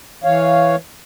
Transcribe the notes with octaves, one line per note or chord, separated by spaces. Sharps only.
E3 C#5 F5